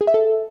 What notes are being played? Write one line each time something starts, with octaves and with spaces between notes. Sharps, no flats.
G#4
E5
A4